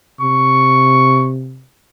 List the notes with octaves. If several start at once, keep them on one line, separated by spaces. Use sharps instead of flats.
C3 C#6